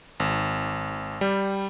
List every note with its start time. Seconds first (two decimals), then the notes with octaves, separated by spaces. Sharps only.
0.20 G#1
1.21 G3